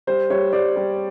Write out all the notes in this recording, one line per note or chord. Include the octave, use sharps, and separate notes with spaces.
G3 C5
G3 C#5
G3 C5 D5
G3